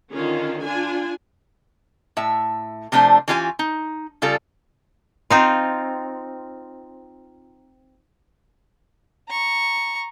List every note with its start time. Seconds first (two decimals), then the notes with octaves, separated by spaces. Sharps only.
0.12 D3 D#3 C#4 F4
0.63 D4 F4 G#5
2.17 A2 E5
2.92 C3 F3 A3 D4 C5
3.28 E3 C#4 F4 G4 C#5 G#5
3.59 D#4
4.22 C#3 G3 F4 A4
5.30 C4 D#4 F4
9.28 A#5 C#6